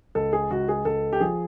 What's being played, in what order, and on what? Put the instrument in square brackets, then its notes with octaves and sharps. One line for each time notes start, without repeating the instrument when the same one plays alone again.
[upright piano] C#2 A4
G#4
C#2 F#4
G#4
C#2 A4
G4
F3 G#4